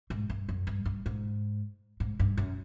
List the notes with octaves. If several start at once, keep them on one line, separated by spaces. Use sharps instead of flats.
G#2
G2
F#2
G2
G2
G#2
G#2
G2
F#2